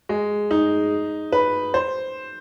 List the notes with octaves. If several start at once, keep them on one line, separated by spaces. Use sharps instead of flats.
G#3
D#4
B4
C5